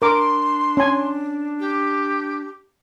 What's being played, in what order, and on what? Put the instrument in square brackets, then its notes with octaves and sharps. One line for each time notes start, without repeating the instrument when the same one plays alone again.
[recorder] D4 [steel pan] A#4 D6 [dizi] C6
[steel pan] C#4 G#5
[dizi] G4